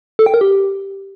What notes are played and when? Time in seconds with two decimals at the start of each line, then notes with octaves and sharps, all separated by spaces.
0.19 A4
0.26 G5
0.34 A#4
0.41 G4